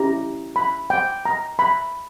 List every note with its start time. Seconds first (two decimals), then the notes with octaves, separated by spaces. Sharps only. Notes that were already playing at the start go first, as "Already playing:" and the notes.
Already playing: C#4 E4 G4 A#5
0.56 B5
0.90 G5
1.25 A#5
1.59 B5